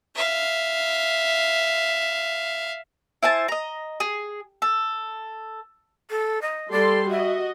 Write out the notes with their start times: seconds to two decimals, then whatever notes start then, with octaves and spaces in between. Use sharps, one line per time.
0.16 E5 F5
3.23 E4 C5 G#5 A5
3.48 D#5 A#5
4.00 G#4
4.62 A4
6.10 A4
6.42 D#5
6.71 G3 A4 D5 C6
7.10 F#4 D#5 E5